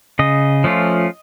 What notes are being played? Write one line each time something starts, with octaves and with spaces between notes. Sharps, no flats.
C#3 D#5
F3 A3 C#4 F4